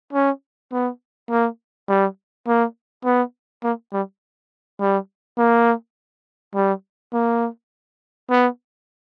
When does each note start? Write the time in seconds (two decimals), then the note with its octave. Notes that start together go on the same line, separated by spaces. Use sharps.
0.13 C#4
0.72 B3
1.30 A#3
1.88 G3
2.47 A#3
3.05 B3
3.63 A#3
3.93 G3
4.80 G3
5.38 A#3
6.55 G3
7.13 A#3
8.30 B3